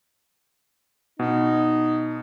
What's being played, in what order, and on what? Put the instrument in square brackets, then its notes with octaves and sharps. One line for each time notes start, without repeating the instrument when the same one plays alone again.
[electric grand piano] B2 [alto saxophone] D#4